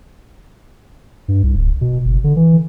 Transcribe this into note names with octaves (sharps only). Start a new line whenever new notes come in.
G2
C2
D1
B2
F#1
D3
E3